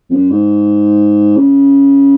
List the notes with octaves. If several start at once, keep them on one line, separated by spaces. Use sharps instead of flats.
F2
F#2
G#2
C#3